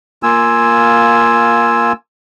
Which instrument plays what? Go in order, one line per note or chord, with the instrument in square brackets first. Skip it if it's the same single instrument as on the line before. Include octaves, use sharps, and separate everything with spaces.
[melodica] A#3 F4 G#5 E6